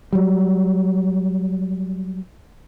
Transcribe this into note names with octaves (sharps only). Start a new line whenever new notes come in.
F#3 G3